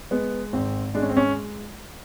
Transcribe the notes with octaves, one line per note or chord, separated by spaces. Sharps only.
G#3 B3
G#1 C4
G#3 D4
C#4
C4
C#4